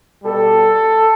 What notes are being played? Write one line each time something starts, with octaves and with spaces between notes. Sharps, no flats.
B2 G3 A4